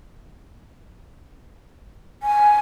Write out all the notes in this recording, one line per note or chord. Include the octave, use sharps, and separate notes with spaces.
G#5